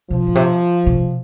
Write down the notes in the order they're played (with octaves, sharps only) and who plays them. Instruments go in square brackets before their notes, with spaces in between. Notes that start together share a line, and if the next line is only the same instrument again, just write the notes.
[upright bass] C3 [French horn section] F3
[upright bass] A#2
C3
C3